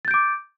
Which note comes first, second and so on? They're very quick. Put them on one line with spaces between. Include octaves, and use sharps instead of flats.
A6 G6 D7 D6